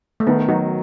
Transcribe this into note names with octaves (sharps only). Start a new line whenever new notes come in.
A3
D#3 B3
F#3 D#4 F#4